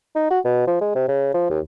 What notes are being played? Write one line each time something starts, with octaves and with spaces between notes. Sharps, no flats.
D#4
F#4
B2
F3
G#3
C3
C#3
F3
D#2